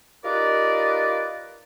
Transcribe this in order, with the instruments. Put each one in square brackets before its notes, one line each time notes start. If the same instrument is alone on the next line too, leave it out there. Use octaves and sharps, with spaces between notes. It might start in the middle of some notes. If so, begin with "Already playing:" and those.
[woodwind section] D#4 F4 G4 A#4 B4 D5